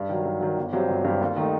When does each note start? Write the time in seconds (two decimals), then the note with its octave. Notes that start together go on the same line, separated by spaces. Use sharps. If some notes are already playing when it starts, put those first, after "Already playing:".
Already playing: G2
0.09 D#3 F#3
0.25 G2
0.41 D#3 F#3
0.57 G1
0.73 G2 F#3 C4 G4
0.89 G1
1.05 G2 F#3 C4 G4
1.21 D#2
1.36 D#3 A3 D#4